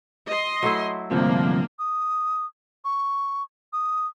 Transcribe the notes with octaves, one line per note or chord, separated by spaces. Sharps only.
D#5 C6
F#3 A3 E4
D2 G2 C3 F3 A#3 D4
D#6
C#6
D#6